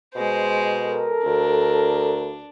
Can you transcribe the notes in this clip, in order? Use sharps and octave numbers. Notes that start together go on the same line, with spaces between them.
B2 G#3 C5
A4 A#4
D2 D4